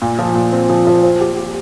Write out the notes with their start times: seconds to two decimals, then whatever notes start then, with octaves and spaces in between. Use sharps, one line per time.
0.02 A#2
0.19 F3
0.35 A#2
0.52 C4
0.69 F3
0.87 F3
1.03 C5
1.20 G4
1.37 G4